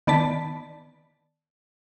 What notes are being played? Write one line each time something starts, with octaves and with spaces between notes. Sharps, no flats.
D#3 B3 D5 A5 B6